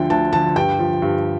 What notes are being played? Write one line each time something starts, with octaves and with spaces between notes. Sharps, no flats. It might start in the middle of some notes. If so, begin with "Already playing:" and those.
Already playing: D2 D3 F3 G5
D2 A5
D3 F3 A5
G2 G5
F3
G2